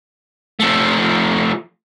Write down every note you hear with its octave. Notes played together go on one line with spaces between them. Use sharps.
F3 A3